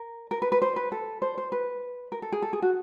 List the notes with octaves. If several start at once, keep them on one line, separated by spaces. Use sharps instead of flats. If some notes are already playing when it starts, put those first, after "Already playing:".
Already playing: A#4
A#4
B4
B4
C5
B4
A4
C5
C5
B4
A#4
A4
G#4
A4
G#4
F#4